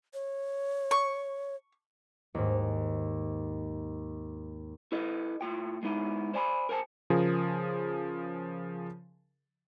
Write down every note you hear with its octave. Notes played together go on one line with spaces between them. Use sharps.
C#5
C#6
D#2 G#2
E4 A4 B4 D#5
A2 F4 G5
G#3 B3 D#4 E4
C5 D5 G#5 A#5 B5
A#4 C5 G#5 A5
C#3 F3 F4 G#4 A#4